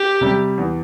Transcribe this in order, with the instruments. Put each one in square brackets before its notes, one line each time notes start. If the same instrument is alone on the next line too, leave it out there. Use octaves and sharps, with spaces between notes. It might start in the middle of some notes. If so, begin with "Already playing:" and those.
Already playing: [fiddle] G4
[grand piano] C3 G3
E2